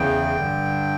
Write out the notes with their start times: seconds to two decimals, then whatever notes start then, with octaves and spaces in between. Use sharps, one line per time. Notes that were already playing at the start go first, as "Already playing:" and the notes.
Already playing: E2 C#3 E3 G5
0.36 G2 D3